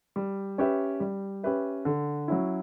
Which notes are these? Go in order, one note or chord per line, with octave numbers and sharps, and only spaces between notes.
G3
C#4 G4 B4 E5
G3
C#4 G4 B4 E5
D3
F#3 C#4 E4